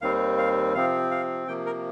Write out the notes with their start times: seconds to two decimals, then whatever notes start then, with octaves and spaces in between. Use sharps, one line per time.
0.01 D#2 D#3 G3 C4 F5
0.38 F5
0.75 C3 F3 C4 F5
1.11 F5
1.48 C3 F3 A#3 G5
1.66 A#4